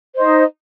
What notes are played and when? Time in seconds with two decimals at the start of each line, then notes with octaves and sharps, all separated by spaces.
0.16 C5
0.18 D#5
0.21 D#4